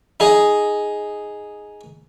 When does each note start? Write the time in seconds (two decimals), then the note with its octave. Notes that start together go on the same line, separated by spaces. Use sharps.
0.20 D#4 G#4 D#5